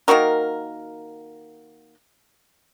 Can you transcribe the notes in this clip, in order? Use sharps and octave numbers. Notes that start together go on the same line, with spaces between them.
D#3 A#3 F#4 A#4